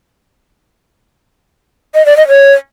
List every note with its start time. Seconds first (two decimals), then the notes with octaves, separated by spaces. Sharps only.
1.95 D#5
2.06 D5
2.17 D#5
2.28 C#5